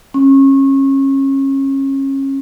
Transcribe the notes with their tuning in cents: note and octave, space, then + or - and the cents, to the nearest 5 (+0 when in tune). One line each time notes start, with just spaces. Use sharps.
C#4 -30